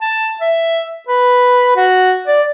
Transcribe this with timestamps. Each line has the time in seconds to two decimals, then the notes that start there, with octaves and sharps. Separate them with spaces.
0.01 A5
0.40 E5
1.08 B4
1.76 F#4
2.27 D5